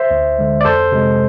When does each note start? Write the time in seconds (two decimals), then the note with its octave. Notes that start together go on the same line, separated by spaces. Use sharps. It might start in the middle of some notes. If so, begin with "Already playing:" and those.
Already playing: C5 E5
0.11 D2
0.39 D3 G#3
0.61 D5
0.65 F2 A4 C5
0.92 C3 G#3